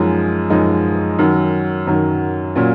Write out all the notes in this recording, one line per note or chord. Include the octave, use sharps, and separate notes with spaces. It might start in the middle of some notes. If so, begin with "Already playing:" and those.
Already playing: F#2 F3 G#3 D#4
F#2 F3 G#3 D#4
F#2 D#3 F#3
F#2 D#3 F#3
A#2 F#3 C#4 F4